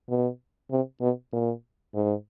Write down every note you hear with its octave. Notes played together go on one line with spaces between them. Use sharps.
B2
C3
B2
A#2
G#2